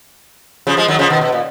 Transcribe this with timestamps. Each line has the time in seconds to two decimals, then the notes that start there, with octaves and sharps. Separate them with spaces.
0.67 C#3 F3
0.77 F3 G#3
0.88 D#3 F#3
0.99 C#3 F3
1.10 B2 D#3
1.21 B2
1.32 A#2